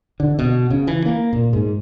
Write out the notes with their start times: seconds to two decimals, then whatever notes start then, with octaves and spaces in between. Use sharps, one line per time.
0.20 D3
0.39 B2
0.70 C#3
0.87 E3
1.06 A#3
1.33 A#2
1.53 G#2